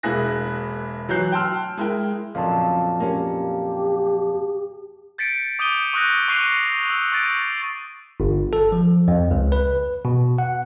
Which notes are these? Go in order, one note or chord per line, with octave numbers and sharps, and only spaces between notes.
E1 A#3 E4 G#4 F#6 A#6
E3 F#3 C#5 F#6 G6 C7
G5 A5 C6 E6 F6
G#3 E4 A#4 G5
F2 A#2 C#3 F#3 F5 A5
A#3 C#4 G4
G6 A6 B6 C#7 D7
D6 D#6 G6 D7 D#7 G7
C#6 D#6 E6 F#6 G6 A#6
C#6 F#6 C7 C#7 F7
E6
C#6 G6 A6 D7
G1
A4
F3
F2
C#2
B4
B2
F#5